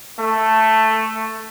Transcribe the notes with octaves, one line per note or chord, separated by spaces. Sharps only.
A3